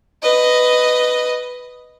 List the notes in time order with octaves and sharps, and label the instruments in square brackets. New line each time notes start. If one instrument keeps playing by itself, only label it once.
[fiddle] B4 D#5